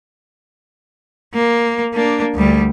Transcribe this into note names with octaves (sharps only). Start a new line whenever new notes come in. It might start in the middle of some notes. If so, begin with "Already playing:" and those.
A#3
A#3 D4
D2 G3